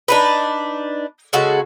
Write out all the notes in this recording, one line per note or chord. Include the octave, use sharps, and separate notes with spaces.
D4 D#4 B4
C#3 G#3 F#4 A4